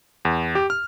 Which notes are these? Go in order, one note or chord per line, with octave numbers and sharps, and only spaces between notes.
E2
G4
F6